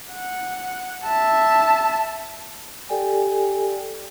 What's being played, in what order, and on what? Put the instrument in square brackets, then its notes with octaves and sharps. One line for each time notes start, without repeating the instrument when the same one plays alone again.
[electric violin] F#5
E5 A5
[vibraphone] G4 A4 D5 G5 G#5